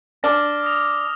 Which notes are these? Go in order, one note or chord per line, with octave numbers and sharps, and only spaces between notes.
D4 D6 F6 A#6
D#6 A#6 F7